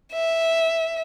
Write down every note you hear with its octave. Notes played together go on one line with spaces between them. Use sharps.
E5